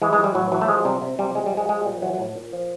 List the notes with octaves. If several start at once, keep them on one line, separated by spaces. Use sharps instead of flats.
E3 G#3
G#3
E3
G3
A2 F#3
E3 F#3
A3
F3 G#3
C3 G3
C3
C3 G3
A#2 G#3
G3
F3
G#3
F3 G#3
A#2 G3
E3 F#3
F#3
A2
A#2
F3